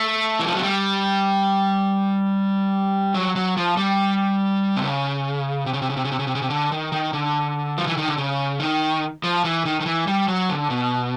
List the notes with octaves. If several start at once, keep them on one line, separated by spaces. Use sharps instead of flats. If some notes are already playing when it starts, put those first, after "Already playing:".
Already playing: A3
E3
F3
F#3
G3
F#3
F#3
F3
G3
C3
C#3
C3
C#3
C3
C#3
C3
C#3
C3
C#3
C3
C#3
C3
D3
D#3
D#3
D3
F3
E3
D#3
D3
C#3
D#3
F3
E3
D#3
D#3
E3
G3
F#3
D3
B2